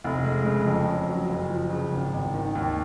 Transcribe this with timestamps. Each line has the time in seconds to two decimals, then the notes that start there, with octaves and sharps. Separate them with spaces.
0.04 F1
0.24 G#3
0.46 C#3
0.66 F2
0.88 C#4
1.09 F#3
1.29 F#1
1.50 F3
1.70 C#3
1.92 G#1
2.13 G#1
2.34 D#3
2.55 D#2